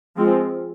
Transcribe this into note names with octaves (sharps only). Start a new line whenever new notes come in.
F3 G#3 C4 F4